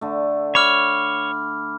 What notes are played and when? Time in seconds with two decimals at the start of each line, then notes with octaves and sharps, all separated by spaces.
0.01 D3 A3
0.55 C#5 B5 D6 F6